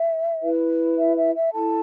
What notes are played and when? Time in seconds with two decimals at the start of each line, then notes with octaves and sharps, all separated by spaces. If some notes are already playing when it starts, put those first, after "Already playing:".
Already playing: E5
0.41 E4 B4
0.98 E5
1.15 E5
1.34 E5
1.52 E4 A4 A5